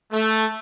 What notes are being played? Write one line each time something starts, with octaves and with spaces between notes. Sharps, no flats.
A3